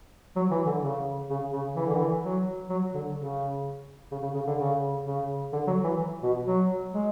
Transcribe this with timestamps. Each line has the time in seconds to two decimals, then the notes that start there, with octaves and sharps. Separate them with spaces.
0.36 F#3
0.51 E3
0.66 D3
0.83 C#3
1.30 C#3
1.53 C#3
1.76 E3
1.86 D3
1.96 E3
2.23 F#3
2.70 F#3
2.94 D3
3.17 C#3
4.12 C#3
4.23 C#3
4.35 C#3
4.47 D3
4.58 C#3
5.05 C#3
5.53 D3
5.67 F#3
5.84 E3
6.23 B2
6.46 F#3
6.93 G#3